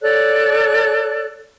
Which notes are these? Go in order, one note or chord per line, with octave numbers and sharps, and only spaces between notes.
A4 C#5 D5 F#6